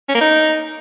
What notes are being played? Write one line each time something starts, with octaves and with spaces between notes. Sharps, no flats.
C#4
A#3
D#4